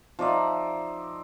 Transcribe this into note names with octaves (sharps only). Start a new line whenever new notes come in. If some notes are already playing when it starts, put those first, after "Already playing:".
F3 D#4 D5 E5